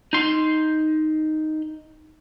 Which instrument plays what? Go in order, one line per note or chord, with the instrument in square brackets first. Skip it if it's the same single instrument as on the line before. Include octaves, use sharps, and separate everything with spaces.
[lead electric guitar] D#4 C6